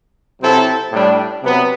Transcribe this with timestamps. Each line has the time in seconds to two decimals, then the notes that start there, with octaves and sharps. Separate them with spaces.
0.42 C3 F#3 C4 E4 A4
0.92 A2 G3 D4
1.43 C3 F#3 B3